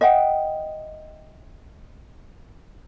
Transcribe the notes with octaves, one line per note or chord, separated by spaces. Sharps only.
D#5 E5 F#5 G5